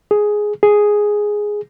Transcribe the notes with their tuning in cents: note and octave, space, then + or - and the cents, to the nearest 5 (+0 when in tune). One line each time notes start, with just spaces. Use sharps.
G#4 +5
G#4 +0